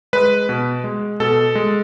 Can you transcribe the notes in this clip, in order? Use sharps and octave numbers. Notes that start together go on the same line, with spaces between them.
G#3 B4
B2
G#3
B2 A4
G#3